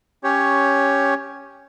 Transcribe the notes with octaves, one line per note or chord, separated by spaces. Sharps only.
C#4 G4 C#5